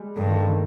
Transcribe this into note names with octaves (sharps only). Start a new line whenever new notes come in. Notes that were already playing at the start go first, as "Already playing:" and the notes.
Already playing: G3 G#3
G2 D3
D#3
D3
D#3